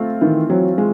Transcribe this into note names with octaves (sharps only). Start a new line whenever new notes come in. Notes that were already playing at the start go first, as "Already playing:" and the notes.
Already playing: A3 C4 F4
D#3 E3
F#3 C4
G#3 F4